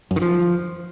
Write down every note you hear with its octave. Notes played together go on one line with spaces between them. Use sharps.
F#2
D#3
F3